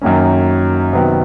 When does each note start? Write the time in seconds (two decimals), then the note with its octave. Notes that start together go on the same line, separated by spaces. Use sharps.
0.01 F#2 D#3 F#3 A#3 C#4
0.93 C3 D#3 F#3 B3